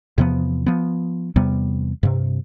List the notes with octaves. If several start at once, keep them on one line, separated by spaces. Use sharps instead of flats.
E2 C3 F3 B3
F3 B3
E2 C3 G3 B3
G2 C3